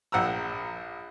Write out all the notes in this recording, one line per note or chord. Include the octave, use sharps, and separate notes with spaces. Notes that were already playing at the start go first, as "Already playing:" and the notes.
A#1 F#5 G5 A#5 E6